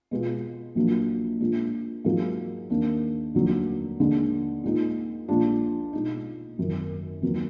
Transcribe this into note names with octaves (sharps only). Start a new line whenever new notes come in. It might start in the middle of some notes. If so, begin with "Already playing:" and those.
B2 G#3 B3 F4
A#1 A#2 F#3 A#3 D4
A#2 F3 G#3 D4
G#2 F#3 A#3 F4 G#4
D#2 D#3 A#3 D4
F1 D#2 D3 F#3
D#2 D3 G#3
A#2 G#3 D#4
A#1 A#2 G#3 D4 F4
B2 G#3 D#4
G#1 F#2 D#3
D#2 D#3 F#3 B3